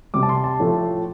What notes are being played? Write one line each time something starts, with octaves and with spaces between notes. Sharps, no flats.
C3 G3 D6
A5
C6
A5
A2 F3 A3